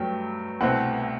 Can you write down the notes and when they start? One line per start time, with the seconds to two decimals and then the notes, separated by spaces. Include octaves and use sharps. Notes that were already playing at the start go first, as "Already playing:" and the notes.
Already playing: G2 F#3 A3 G5
0.61 C2 B2 A3 C4 F#5